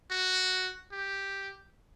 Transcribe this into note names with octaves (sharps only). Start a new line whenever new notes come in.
F#4
G4